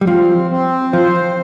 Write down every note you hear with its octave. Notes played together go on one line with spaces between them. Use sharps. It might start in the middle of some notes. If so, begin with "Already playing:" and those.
G3
F3 C4
C4
F3 C5